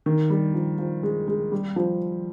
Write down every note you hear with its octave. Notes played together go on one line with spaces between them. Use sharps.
D#3
G3
F3
F3
G#3
G#3
G3
F3